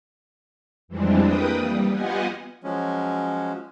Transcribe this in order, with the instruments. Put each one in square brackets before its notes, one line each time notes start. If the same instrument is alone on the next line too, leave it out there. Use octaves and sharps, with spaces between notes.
[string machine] F2 E3 G3 G#3 C4 D4
A#3 B4 G5 D#6
G3
B3 F4 G4 D#5 F#5 G#5
[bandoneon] F3 F#3 G#3 C#4